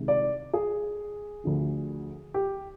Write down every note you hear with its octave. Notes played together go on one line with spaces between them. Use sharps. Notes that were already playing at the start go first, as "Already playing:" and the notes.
Already playing: C2 C3 D#3 G#3
D5
G#4
D2 D3 F3
G4